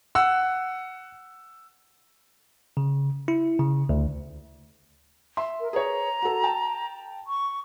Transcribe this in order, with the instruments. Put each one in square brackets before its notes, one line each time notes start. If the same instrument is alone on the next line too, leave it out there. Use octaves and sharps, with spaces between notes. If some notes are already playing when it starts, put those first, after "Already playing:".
[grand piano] F#5 E6
[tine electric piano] C#3
E4
C#3
D2
[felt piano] E5 C6
[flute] A#4
[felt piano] G#4 B4 C#5 [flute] A#5
[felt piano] F#4 A4
G5 A5
[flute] C#6